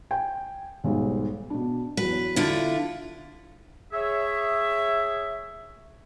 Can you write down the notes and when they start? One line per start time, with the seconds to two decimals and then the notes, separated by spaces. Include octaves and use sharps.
0.11 G5 G#5
0.84 B1 G#2 G3
1.50 B2 D4
1.97 E2 F#3 B4
2.36 D3 E4 F4
3.93 G#4 C#5 E5